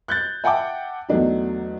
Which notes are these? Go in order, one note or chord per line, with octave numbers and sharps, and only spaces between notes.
F#6 G6 A6
E5 F#5 G5 A5 D6
E2 F#3 A3 D4 D#4